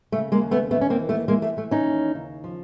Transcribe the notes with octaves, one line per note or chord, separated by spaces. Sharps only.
C#3 A3
G#3 A#3
D#2
A3 B3
D#2 A3 B3
C#4
A#3 C4
E3
A3 B3
E3 G#3 A#3
A3
E3 A3
C#4 D#4
D#2
C#3
F3